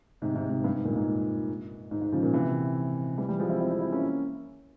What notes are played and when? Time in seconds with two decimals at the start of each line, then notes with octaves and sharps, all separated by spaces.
0.22 G#2 C3
0.36 G#2 C3
0.50 G#2
0.64 G2
0.75 G#2
0.85 G2 A#2
0.96 G#2
1.91 G#2
2.02 G#2
2.12 C#3 F3
2.23 A#2 C#3
2.33 C3 E3
3.18 E3 G3
3.29 E3 G3
3.39 F3 G#3
3.50 C4 E4
3.60 C4 E4
3.71 C4 E4
3.81 C4 E4
3.92 A#3 C#4